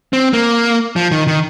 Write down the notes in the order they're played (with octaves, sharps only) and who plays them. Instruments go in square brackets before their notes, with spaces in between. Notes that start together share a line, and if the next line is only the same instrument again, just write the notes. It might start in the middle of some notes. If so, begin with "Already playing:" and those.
[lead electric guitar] C4
A#3
F3
D#3
D#3